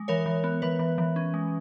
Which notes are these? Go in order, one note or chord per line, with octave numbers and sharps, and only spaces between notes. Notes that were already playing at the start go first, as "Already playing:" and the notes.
Already playing: G#3
E3 A#4 C#5
E3
B3
E3 B4
E3
E3
C#4
G#3